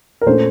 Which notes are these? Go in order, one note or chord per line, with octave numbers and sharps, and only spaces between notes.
A#4
A#2 A3 C#4 A4 C5